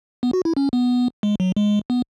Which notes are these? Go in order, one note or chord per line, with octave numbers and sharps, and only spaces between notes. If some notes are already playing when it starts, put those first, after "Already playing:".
B3
F#4
E4
C#4
B3
G#3
F#3
G#3
B3